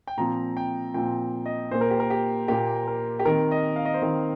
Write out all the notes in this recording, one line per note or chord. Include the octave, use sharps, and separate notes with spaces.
G5
A#2 F3 C4 A#5
G5
A#2 F3 C4 G5
D#5
A#2 A#3 C5
A#4
G4
A#4
G4
A#2 A#3 G4
A#4
G4
D#3 C4 A#4
D#5
F5
D#5
C5
D#3 C4 D#5